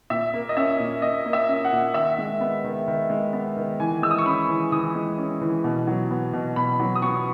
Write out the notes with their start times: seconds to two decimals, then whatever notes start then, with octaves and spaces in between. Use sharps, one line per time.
0.10 A#2 E5
0.34 A#3
0.49 D#5
0.57 C#4 E5
0.79 A#2
1.02 A#2 D#5
1.26 A#3
1.33 E5
1.49 C#4
1.65 F#5
1.72 A#2
1.94 D#3 E5
2.18 G#3
2.41 B3
2.64 D#3
2.88 D#3
3.10 G#3
3.33 B3
3.57 D#3
3.80 E3 G#5
4.02 G#3 E6
4.11 D#6
4.18 C#6
4.26 C#4 B5
4.49 E3
4.72 E3 D#6
4.95 G#3
5.18 C#4
5.41 E3
5.64 B2
5.87 F#3
6.11 B3
6.33 B2
6.56 B2 B5
6.80 F#3
6.96 D#6
7.02 B3 C#6